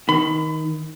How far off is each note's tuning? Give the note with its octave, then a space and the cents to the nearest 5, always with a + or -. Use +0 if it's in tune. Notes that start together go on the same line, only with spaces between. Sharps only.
D#3 +15 B5 +30